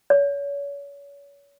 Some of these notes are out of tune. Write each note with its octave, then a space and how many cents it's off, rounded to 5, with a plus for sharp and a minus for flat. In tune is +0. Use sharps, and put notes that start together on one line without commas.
C#5 +35